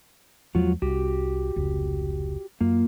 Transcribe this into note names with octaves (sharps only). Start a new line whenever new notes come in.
E2 F3 F#3 G#3 F4 F#4
C2 F#4 G4
F1 C#2
F#2 A#3 F4